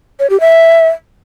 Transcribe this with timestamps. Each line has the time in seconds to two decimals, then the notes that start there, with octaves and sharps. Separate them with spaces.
0.20 C#5
0.30 G4
0.40 E5